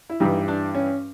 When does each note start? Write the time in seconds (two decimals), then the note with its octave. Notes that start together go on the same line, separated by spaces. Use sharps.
0.10 E4
0.20 G2 E3 G3 D#4
0.48 D4
0.75 C#4